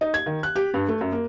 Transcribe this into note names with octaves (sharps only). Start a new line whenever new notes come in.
D#4
G#6
D#3
F#6
G4
G2
A3
F#2
A#3